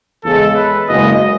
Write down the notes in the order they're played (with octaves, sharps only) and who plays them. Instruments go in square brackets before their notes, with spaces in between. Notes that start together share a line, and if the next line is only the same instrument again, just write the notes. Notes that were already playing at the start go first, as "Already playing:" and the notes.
[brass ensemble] E2 C#3 G#3 [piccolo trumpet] A4
[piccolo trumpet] B4
[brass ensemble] F#1 E2 C#3 G#3 [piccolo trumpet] D#5